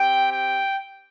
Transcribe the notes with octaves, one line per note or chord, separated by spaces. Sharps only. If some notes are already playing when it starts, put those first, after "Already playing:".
Already playing: C4 G4 G5
G5